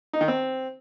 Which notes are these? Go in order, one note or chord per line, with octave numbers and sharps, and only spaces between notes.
D#4
D#3
C4